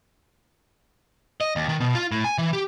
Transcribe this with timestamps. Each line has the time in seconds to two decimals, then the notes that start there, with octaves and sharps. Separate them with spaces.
1.41 D#5
1.56 D#2
1.69 D#3
1.80 B2
1.95 F4
2.12 A2
2.24 G#5
2.38 E3
2.53 G4